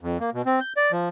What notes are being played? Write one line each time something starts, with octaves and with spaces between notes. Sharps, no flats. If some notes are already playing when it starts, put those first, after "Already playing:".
F2
A#3
B2
C4
G6
D5
F3